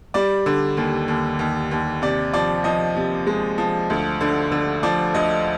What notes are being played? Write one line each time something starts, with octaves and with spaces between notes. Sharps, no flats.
G3 D5
D3
D#2
D#2
D#2
D#2
C3 D5
F3 D5
F3 D#5
C3
G#3
F3
D2
D3
D3
F3 D5
D2 D#5